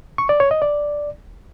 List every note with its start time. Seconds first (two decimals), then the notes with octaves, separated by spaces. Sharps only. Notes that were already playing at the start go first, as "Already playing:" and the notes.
0.18 C#6
0.29 D5
0.40 C#5
0.51 D#5
0.62 D5